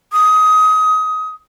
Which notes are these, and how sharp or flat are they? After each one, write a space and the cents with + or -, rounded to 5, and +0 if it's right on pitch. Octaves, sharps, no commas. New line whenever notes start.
D#6 +20